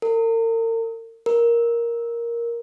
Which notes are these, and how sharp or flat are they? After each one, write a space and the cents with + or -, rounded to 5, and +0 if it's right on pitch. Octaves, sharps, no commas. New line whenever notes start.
A#4 -40
A#4 +5